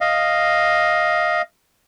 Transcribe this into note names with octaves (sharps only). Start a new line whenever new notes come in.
D#5 F5